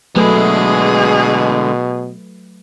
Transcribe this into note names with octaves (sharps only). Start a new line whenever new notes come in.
B2 D3 F#3 G#3 A3 G#4 B4